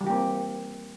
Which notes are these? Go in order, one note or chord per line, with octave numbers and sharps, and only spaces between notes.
E3 G3 A#3 C4 G4